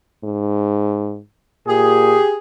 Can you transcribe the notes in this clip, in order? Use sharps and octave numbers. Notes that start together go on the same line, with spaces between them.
G#2
A#2 G4 G#4